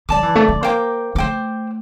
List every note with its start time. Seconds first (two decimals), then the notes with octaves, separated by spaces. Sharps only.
0.09 G3 D5 A5 D6
0.23 E3
0.35 A3
0.48 A3
0.63 A#3 C5 G5 D6
1.15 A3 C5 G5 D6